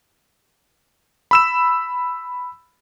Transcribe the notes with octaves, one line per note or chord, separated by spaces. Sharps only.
B5 E6 E7